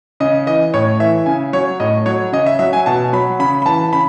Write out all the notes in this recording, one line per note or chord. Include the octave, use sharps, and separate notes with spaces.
C#3 D#5
E3 D#5
A2 C#5
E3 E5
C#3 G#5
F#3 C#5
A2 D#5
F#3 C#5
C#3 D#5
E5
F#3 E5
G#5
B2 A5
F#3 B5
C#3 B5
B5
E3 A5
C#3 B5